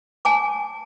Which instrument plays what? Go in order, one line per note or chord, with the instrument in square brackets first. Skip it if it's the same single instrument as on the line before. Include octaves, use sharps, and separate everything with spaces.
[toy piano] G#5 A5 D6